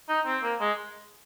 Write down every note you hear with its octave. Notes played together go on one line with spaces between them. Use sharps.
D#4
C4
A#3
G#3